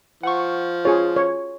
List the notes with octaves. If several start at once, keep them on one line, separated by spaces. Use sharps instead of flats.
F3 F#5 C#6
F4 G#4 C#5
C#5